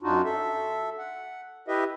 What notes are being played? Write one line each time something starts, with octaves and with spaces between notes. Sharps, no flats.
F#2 D4 D#4 F4 F#4
A4 E5
F#5
E4 G4 B4 D#5 E5